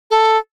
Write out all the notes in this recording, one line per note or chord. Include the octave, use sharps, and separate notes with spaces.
A4